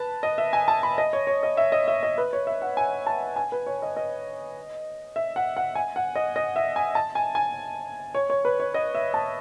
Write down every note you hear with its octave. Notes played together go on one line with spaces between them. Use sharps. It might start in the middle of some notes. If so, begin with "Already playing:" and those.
Already playing: B4 A5
D#5
E5
G#5
A5
B5
D#5
C#5
C#5
D#5
E5
D#5
E5
D#5
B4
C#5
E5
F#5
G#5
A5
G#5
B4
C#5
D#5
D#5
E5
F#5
F#5
G#5
F#5
D#5
D#5
E5
G#5
A5
G#5
G#5
C#5
C#5
B4
C#5
D#5
E5
A5